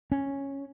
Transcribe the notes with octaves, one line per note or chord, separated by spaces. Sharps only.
C#4